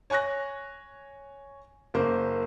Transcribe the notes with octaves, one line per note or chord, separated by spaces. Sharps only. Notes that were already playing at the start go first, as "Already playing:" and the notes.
C#5 G#5 C#6 F#6 A#6
F#1 A#3 C5